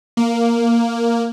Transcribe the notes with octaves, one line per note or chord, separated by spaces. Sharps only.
A#3